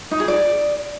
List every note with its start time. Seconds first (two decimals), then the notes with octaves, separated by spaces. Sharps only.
0.11 D#4
0.20 G#4
0.28 D5